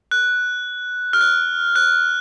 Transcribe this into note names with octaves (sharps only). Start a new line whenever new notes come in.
F#6
F6
F#6
F#6